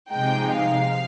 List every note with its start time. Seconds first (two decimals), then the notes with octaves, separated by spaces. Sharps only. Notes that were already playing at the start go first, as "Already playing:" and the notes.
0.11 C3 F3 G#3 D#4 G5
0.58 F5